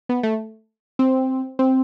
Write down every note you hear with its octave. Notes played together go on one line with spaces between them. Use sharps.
B3
A3
C4
C4